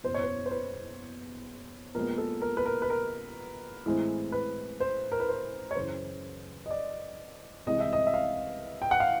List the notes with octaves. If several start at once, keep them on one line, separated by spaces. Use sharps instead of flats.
F#1 E2 B2 C5
C#5
C5
C5
B4
A#2 F3 G#3 B3 A#4
A4
A#4
B4
A#4
B4
A#4
A2 E3 G#3 C4
B4
C5
A#4
B4
C5
C#5
F#2 C#3 E3 C5
D#5
D5
C2 C3 E3 G#3 D#5
E5
D#5
E5
F5
G5
F#5
F5